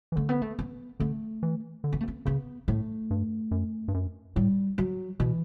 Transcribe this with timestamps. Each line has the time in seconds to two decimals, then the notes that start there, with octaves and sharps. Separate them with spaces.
0.12 E3
0.16 D3 A3
0.29 B3
0.42 A3
0.59 B3
1.00 D3 A3
1.43 E3
1.84 D3
1.93 B3
2.01 A3
2.08 B3
2.25 C#3 B3
2.68 A2 A3
3.11 G2
3.51 F#2
3.88 G2
3.94 F#2
4.36 A2 G3
4.78 F#3
5.19 B2 E3